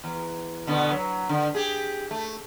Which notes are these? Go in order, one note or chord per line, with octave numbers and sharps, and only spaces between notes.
E2
B2 D3 B3
F#3
D3
G4 G#4
A3